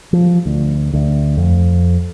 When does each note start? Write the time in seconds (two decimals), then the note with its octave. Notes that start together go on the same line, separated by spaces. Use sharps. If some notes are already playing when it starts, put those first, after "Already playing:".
0.13 F3
0.46 D2
0.93 D2
1.37 F2